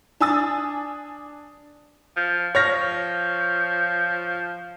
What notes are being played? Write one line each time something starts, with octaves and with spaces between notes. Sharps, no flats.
D4 G#5 D#6 A6
F3
F3 C#5 F6 A#6